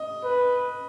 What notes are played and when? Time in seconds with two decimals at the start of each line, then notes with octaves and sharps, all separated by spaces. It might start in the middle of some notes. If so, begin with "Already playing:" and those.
Already playing: D#5
0.24 B4